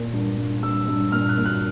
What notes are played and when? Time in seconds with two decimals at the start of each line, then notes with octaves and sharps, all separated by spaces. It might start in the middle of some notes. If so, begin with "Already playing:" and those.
Already playing: A#2
0.13 G2
0.38 G2
0.63 G2 E6
0.88 G2
1.12 A#2 F6
1.29 F#6
1.38 A#2
1.46 F#6